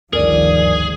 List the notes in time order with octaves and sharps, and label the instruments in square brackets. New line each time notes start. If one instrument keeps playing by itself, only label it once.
[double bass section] G1 D#3 F3 [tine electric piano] D2 G2 [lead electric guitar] G#4 [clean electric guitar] A#4 D5